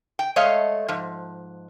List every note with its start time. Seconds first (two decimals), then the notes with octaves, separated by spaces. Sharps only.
0.19 G5
0.36 G#3 A3 C#5 D#5 F5
0.88 G#2 F3